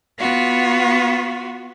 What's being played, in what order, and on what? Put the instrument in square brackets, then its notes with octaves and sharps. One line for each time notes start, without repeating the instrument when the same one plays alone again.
[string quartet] B3 F4 F#4